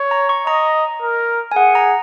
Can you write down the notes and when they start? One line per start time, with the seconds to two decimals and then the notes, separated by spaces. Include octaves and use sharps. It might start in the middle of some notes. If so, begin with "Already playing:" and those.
Already playing: C#5
0.11 A#5
0.29 C#6
0.47 D#5 A#5
1.02 A#4
1.52 G#5
1.56 G#4 F#5
1.75 A#5